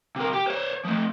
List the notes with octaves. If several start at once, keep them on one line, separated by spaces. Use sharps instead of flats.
C3 A#4
G4
C5 C#5
F3 A3